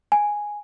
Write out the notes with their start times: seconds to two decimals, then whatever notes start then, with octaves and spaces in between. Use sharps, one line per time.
0.12 G#5